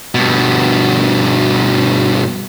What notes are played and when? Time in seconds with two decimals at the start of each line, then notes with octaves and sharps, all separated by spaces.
0.15 G2 B2